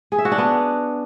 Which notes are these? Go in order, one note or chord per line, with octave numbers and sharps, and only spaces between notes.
G#4
E5
F#4
D4
B3